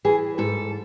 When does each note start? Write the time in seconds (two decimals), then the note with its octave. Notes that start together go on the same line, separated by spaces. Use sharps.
0.05 E3 G#4
0.38 G#2 A4